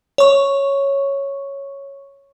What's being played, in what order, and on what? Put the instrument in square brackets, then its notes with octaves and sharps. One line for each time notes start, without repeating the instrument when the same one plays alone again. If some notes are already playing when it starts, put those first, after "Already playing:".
[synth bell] C#5 C#6